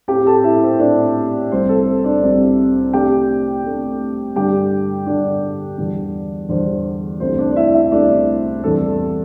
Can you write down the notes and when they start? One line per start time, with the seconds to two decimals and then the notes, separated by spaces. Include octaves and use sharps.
0.08 A2 A3 C4 G4 G5
0.26 A4 A5
0.44 E4 E5
0.62 C5
0.79 A2 A3 C4 D4 D5
1.51 C2 C3 G3 C4 C5
1.69 A4
1.87 C5
2.04 D4 D5
2.22 C2 C3 G3 C4
2.93 C3 A3 D4 G4 G5
3.64 C3 A3 D4
4.36 G2 D3 G3 D4 G4 G5
5.06 G2 D3 G3 D4 D5
5.78 E2 D3 G3 D4
6.49 E2 D3 G3 D4 C5
7.20 C2 C3 A3 D4 C5
7.38 D4 D5
7.51 D5
7.56 E4 E5
7.74 E4 E5
7.92 C2 C3 A3 D4 D5
8.63 E2 C3 G3 D4 A4